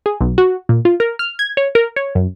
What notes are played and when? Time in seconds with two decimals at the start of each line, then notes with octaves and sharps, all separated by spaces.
0.06 G#4
0.21 B1
0.38 F#4
0.69 A#2
0.85 F4
1.00 A#4
1.19 F6
1.39 G#6
1.57 C#5
1.75 A#4
1.96 C#5
2.15 F#2